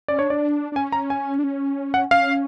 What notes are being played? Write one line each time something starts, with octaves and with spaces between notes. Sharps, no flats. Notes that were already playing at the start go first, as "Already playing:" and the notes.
C#4 D5
D4 C#5
D4 D5
D4
C#4 G#5
A#5
G#5
D4
C#4
F#5
C#4 F5